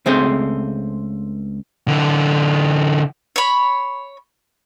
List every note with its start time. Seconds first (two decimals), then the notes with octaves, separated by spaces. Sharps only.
0.06 C#2 A3 C4 G#4 C5
1.88 D3 E3
3.36 C#5 B5